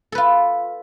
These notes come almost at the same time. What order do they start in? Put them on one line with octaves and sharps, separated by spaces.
A4 B4 F4